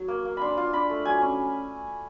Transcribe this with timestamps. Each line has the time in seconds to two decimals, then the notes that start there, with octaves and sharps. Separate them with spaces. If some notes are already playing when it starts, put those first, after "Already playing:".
Already playing: F#3
0.08 A#3
0.25 A#3
0.37 D4 B5 C6
0.57 F4 C6
0.73 D4 B5
0.90 A3
1.05 F#3 G#5
1.22 C#4